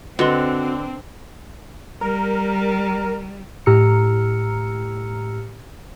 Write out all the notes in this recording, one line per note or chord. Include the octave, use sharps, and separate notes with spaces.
D3 C4 F#4 B4 D#5 C6
G3 A#4
A2 G4 A#5 E6 F6 C#7